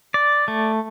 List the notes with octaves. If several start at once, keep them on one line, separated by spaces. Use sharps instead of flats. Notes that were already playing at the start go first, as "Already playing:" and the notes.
D5
A3